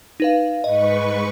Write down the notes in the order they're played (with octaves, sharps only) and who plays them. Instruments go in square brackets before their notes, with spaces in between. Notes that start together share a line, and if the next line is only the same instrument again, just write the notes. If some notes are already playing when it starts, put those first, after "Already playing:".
[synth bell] D#4 B4 F5
[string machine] G#2 B4 C#6 [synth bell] D#5